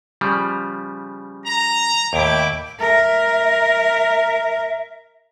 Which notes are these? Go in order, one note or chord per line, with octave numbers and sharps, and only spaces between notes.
C#3 F3 G3
A#5
D#2 A2 E4 G5 D6
A#4 E5